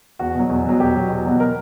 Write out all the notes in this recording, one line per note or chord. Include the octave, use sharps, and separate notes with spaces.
E2 F#4
B2 F#3
E2
B2 F#3
E2 G4
B2 F#3
E2
B2 F#3
A#4